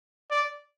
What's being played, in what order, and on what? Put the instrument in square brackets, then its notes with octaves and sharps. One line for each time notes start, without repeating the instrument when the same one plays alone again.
[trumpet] D5